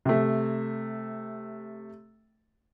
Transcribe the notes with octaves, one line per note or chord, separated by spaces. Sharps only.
C3 A3